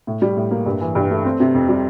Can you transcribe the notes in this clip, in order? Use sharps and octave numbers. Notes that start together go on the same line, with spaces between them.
A2
G3
A2
A#3
G2
E3
G2
A3
C4
C3
F2
G3